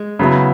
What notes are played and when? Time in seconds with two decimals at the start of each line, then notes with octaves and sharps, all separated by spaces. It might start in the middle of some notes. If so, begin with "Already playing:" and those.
Already playing: G#3
0.19 C#3 F#3 B3 E4